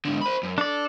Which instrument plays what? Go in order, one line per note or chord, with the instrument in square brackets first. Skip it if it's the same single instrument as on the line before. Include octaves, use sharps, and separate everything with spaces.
[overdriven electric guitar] G#2 D3
C5 B5
F#2
[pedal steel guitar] D4 D5 [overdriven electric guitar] A4